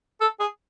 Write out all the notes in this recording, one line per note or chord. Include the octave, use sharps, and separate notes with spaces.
A4
G#4